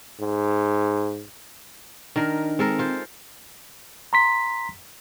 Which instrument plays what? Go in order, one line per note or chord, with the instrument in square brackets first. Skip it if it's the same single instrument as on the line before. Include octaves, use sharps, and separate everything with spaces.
[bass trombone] G#2
[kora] D#3 A#4 [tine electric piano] D4
[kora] G#3 A4 A#4 [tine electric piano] C4
[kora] F4 C5
[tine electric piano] A#5 C6 B6